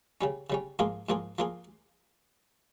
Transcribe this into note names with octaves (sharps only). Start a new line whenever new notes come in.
C#3 G3 C#4
C#3 G3 C#4
G#2 F3 A#3 F4 G#4
G#2 F3 A#3 F4 G#4
F3 A#3 F4 G#4